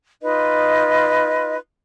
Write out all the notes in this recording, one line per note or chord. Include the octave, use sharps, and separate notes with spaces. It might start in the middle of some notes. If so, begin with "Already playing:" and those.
D#4 F4 B4 D#5